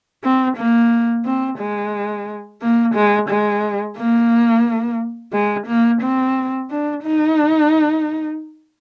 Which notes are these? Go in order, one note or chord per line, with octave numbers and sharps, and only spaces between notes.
C4
A#3
C4
G#3
A#3
G#3
G#3
A#3
G#3
A#3
C4
D4
D#4